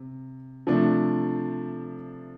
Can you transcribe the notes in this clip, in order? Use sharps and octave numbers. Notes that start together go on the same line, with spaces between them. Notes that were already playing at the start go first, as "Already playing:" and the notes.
Already playing: C3
C3 F3 A3 D4